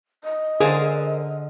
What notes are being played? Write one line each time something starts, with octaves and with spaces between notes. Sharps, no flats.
D#5
D3 G#4 A#4 C5 F5 G#5